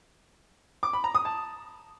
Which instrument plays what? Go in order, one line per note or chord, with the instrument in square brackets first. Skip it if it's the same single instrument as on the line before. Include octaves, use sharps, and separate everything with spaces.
[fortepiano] D6
B5
A#5
D#6
A5